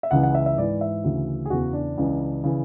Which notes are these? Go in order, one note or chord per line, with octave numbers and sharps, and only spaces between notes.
E5
C#2 C#3 E3 F#5
F#5
E5
E5
G#2 E3 D5
E5
D2 C#3 E3
G#4
E2 C#3 E3 F#4
D4
C#2 C#3 E3
C#3 E3